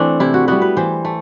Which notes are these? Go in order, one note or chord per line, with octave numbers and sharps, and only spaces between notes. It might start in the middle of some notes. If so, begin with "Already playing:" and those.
Already playing: E3 A3 C4 D4
C3 E4
F#4
G3 B3 F#4
B4
E3 C5
A3